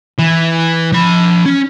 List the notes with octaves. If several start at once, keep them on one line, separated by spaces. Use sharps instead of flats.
E3
F3 B5
C#4